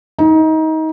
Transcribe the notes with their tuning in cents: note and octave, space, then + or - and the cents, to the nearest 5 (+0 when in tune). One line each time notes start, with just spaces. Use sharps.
D#4 +25